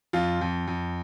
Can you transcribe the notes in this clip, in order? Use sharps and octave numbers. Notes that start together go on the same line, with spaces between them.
F2 F4
F2
F2